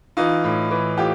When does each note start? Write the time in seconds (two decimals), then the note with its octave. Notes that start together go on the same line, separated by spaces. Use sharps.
0.17 E3 D#4 F4
0.44 A2
0.71 E3
0.98 A2 F4 G4